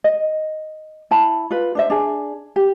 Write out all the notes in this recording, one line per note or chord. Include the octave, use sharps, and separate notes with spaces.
D#5
E4 A5 B5
F4 B4
D4 C5 E5
D4 G#4
G4